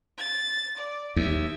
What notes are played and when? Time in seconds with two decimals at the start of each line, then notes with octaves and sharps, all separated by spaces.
0.18 A6
0.77 D5
1.16 D#2 E5